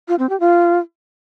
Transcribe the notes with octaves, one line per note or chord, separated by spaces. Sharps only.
F4
C4
G4
F4